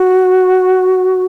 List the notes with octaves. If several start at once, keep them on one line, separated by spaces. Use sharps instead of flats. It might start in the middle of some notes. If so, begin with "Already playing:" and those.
Already playing: F#4